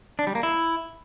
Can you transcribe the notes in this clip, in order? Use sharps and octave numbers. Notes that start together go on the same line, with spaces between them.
D4
G3
A#3
E4